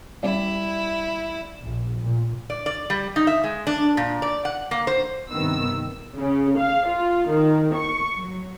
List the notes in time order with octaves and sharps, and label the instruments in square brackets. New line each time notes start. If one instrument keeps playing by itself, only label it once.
[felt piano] G3 D5 [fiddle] E4
[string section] A#1
A#2
[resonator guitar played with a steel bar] D5
D5
G3
D#4
E5
G#3
D4
A#2
D5
F#5
A#3
C5
[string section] G2 C3 D#3 B3 E6
C#3
F5
F4
D#3
C#6
F#3